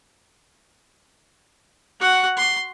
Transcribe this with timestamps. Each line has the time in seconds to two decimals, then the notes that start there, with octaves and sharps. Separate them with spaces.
2.00 F#4 F#5
2.37 C6